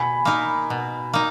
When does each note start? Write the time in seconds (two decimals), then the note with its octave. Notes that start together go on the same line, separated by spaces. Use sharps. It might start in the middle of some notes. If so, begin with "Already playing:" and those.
Already playing: B2 G#5 B5
0.25 A#3 D#4 A#4
0.70 B2
1.13 A#3 D#4